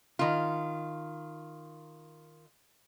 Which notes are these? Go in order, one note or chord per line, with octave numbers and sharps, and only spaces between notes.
D#3 F4